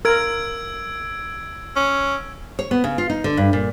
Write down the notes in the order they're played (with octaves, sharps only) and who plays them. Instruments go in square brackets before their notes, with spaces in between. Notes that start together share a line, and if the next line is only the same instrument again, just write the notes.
[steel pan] A#4 [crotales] E6 G#6 D7
[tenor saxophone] C#4
[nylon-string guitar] C#5
B3
C#3
F4
D#4
D3
G2
A#2